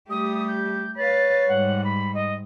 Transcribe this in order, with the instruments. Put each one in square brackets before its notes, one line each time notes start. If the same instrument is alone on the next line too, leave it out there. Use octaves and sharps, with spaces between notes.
[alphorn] G3 [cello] A3 G4 [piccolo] D#6
[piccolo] G6
[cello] B4 F5 [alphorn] C#5 [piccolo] A6
[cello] G#2 G3 [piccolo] F#5
[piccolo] B5
D#5